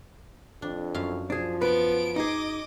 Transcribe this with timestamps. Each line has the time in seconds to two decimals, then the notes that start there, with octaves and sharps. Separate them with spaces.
0.62 F2 D4
0.95 F#2 F5
1.30 F3 D4 G#4
1.61 B3 B4 D7
2.16 D#4 G#4 D#5 D6